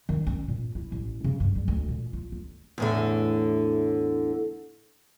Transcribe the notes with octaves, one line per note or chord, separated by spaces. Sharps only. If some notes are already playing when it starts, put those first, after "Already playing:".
D#3
C#4
A#2
E4
A1
C#3
G2
G3
D2
A#2
F4
D2
E2 A2 D3